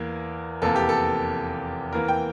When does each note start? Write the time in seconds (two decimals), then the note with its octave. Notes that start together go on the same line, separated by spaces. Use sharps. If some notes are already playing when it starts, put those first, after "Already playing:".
Already playing: E2 E3 A#3
0.62 F1 E2 E3 A#3 A4
0.76 G4
0.89 A4
1.93 E2 E3 A#3 A#4
2.08 G5